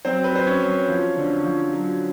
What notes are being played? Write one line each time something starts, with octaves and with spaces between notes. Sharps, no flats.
F#3 C4 C5
B4
F#3 C5
C#4 C#5
F#3
F3
D3
F3
F#3